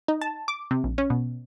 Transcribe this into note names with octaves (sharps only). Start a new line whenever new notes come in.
D#4
A5
D6
C3
A#1
C#4
B2